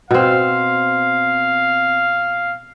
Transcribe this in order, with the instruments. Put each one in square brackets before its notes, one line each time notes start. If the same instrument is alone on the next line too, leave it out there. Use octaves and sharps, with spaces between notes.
[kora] B2 C4 [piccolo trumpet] F5